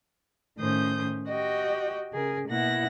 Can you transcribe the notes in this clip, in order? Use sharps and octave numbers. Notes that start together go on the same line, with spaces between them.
A2 D#3 C#4 C5 D#6 G6
F#4 G4 D#5 G5
C#3 G#4 A#4
B2 A#3 E4 F#5 F#6 A#6